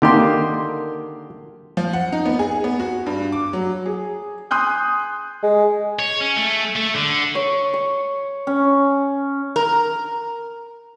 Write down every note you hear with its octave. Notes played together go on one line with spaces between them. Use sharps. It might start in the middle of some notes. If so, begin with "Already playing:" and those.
D3 D#3 A#3 G4 C6
F3
F#5
D#4
B3
G#4
B3
F#4
G2
D6
F#3
G#4
G#5 C6 D#6 F#6 G6
G#3
C#5
C#4
A3
A3
D3
C#5
C#6
C#4
A#4